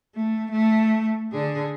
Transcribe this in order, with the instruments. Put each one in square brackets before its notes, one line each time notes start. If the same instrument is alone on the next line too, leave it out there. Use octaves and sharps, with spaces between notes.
[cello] A3
A3
D3 G#4